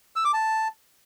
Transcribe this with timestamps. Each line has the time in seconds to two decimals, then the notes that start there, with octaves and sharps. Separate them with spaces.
0.16 E6
0.25 D6
0.34 A5